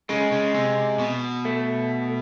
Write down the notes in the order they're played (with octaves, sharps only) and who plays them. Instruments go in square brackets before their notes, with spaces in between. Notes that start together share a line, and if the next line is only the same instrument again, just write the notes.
[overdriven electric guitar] C#3 [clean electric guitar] G#3
[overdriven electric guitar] C#3
C3
B2
[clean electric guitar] A3